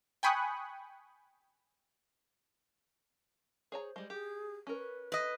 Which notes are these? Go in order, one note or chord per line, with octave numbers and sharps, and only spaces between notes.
G5 G#5 B5 C#6 D#6 F#6
G#4 C5 C#5 A#5
G3 G#3
G4 G#4
C#4 A#4 B4
B4 D#5